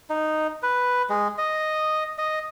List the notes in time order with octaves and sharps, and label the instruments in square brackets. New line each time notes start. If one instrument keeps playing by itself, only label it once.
[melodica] D#4
B4
G#3
D#5
D#5